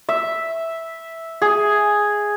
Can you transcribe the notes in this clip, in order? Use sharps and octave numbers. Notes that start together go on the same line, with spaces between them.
E5
G#4